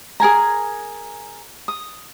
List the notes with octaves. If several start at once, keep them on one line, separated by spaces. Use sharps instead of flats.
G#4 A#4 G#5 A#5
D#6